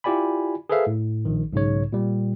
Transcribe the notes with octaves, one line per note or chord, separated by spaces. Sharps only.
E4 F4 G4 D5 G#5 B5
G#4 A4 B4 C5 E5 F5
A2
A#1 D#3
B1 G#2 C#3 C#5
A#2 G3